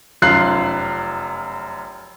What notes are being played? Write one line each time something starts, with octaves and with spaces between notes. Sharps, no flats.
F1 F#2 F4 F#6 C7